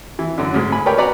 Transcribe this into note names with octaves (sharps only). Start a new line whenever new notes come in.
E3
F#2 D3
D2 G#2
G#5 B5
G4 A#4 B4 C#5 D5 G5
F#4 B4 D5 F#5 A#5 B5